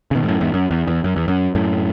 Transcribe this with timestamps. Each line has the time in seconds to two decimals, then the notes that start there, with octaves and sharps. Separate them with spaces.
0.11 C#3
0.16 B2 D#3
0.24 G#2
0.28 F#2 A2
0.41 E2 G#2
0.54 F#2
0.71 E2
0.87 E2
1.04 F#2
1.16 E2
1.28 F#2
1.55 F#2 A2